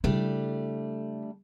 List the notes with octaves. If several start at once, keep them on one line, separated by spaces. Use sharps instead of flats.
C#3 G3 A3 D4 E4